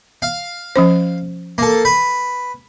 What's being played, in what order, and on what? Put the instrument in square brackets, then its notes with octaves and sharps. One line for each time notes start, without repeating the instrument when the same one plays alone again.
[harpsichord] F5
[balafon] F3 C#4 C5
[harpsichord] A#3 A4
B4